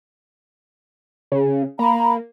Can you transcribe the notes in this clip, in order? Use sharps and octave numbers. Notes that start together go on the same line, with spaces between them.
C#3
A#3 A#5 B5